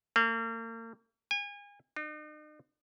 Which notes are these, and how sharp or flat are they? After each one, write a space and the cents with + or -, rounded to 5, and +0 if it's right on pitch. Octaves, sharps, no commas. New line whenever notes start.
A#3 -40
G#5 -35
D#4 -45